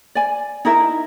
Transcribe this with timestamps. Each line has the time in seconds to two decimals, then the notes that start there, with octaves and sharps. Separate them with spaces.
0.15 D5 G#5
0.65 D#4 E4 A#4 E5